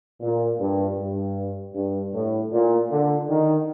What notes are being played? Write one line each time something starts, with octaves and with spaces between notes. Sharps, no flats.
A#2
G2
G2
G2
A2
A#2
D3
D#3